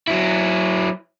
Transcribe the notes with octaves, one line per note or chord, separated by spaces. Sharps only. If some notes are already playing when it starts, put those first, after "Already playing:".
F#3 E4